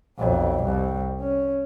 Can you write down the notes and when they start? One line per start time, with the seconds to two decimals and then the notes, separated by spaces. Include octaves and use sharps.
0.18 B1 F2
0.64 C2
1.20 C#4